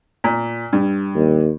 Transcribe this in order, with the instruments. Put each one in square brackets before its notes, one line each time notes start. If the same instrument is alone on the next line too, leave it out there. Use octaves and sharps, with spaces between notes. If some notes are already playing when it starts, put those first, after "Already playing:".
[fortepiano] A#2
G2
[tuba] D#2